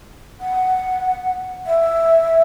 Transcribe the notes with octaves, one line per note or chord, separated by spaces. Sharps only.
F#5
E5